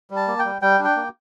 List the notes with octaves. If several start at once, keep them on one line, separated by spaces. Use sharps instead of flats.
G3
A5
A#3
G5
G3
G3 G5
D4
G5
A#3